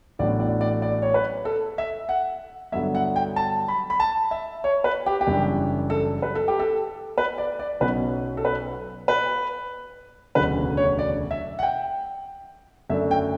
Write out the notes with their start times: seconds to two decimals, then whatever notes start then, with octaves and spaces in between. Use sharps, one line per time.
0.19 A1 A2 F#3 B3 D4 D5
0.40 D5
0.61 D5
0.82 D5
1.02 C#5
1.14 B4
1.45 A4
1.78 E5
2.09 F#5
2.72 G2 D3 F#3 B3 E5
2.95 F#5
3.16 G5
3.36 A5
3.68 B5
3.90 B5
4.00 A5
4.31 E5
4.64 C#5
4.84 B4
5.06 G4
5.21 G4
5.27 F#1 F#2 E3 G3 D4
5.90 A4
6.22 B4
6.35 A4
6.48 G4
6.59 A4
7.18 B4
7.38 D5
7.59 D5
7.80 B1 B2 F#3 C#4 B4
8.37 A4
8.45 B4
9.08 B4
10.35 E1 D2 C#3 F#3 B4
10.77 C#5
10.99 D5
11.31 E5
11.59 F#5
11.63 G5
12.90 F#2 D3 A3 D4 E5
13.11 G5